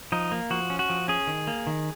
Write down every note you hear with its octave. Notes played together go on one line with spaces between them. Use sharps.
F3 D#4
A#3
F3 F#4
C#4
F#4
F3
C#4 G#4
D#3
A#3
D#3